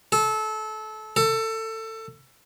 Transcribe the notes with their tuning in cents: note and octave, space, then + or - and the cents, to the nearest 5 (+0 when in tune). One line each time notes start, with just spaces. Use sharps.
A4 -25
A4 +20